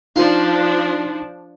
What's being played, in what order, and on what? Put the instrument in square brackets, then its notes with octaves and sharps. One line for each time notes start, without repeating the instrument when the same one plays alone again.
[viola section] F3 D4 [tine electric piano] D#4 [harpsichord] F4